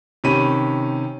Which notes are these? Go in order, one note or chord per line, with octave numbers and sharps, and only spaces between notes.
C3 D#3 C#4 B5 D#7